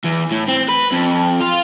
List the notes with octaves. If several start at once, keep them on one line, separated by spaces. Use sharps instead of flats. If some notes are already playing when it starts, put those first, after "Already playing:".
E2
A2
C4
B4
F2
F4